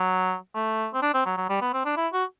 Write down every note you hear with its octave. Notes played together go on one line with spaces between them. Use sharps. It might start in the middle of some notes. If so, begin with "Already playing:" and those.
Already playing: F#3
A3
C4
D4
C4
F#3
F#3
G3
B3
C4
D4
E4
F#4